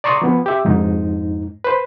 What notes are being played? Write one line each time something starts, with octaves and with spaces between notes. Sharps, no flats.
D5 A#5 C6 C#6 D#6
F3 B3
G4 E5
F2 G#2 D#4
B4 C5